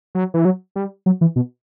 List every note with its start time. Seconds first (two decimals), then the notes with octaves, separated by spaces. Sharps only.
0.15 F#3
0.34 E3
0.45 F#3
0.76 G3
1.06 F#3
1.21 E3
1.36 B2